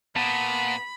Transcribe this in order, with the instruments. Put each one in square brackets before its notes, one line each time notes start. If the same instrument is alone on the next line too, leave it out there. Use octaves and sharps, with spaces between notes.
[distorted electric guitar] A#2 [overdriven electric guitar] B3 [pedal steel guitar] A5 [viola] B5